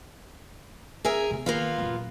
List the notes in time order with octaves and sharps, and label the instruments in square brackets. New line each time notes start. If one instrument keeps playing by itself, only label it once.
[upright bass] C#4 [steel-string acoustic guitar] G#4 A#4 E5
[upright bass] C3 B3
[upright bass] D#3 [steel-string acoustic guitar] A#3 B3 F4
[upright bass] D#1 F#2